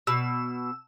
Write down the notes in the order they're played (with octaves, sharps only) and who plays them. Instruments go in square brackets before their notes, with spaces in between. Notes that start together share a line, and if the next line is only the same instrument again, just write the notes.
[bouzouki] B2 [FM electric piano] E6